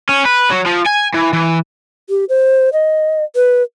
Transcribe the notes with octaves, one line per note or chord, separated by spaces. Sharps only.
C#4
B4
F#3
F3
G#5
E3
E3
G4
C5
D#5
B4